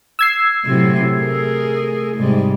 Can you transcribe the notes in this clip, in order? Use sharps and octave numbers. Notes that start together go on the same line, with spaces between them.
E6 G#6 C7
A2 C3 F#3
A3 G#4 A#4
G#2 C3 G3